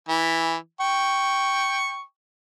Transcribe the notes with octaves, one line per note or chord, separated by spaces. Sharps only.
E3
G5 C#6